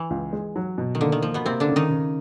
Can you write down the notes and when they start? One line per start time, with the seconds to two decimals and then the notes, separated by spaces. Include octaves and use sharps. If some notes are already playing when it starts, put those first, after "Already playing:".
Already playing: E3
0.10 C#2
0.33 G#3
0.56 F#3
0.78 B2
0.95 D#3
1.01 D3 A#3
1.12 D#3
1.22 F3 A#3
1.34 B2 B3
1.45 C3 A#3 C4
1.60 D3 D4
1.69 C#3
1.76 D#3 D#4
1.91 C#3